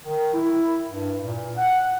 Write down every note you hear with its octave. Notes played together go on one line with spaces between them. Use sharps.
D#3
E4
G2
A#2
F#5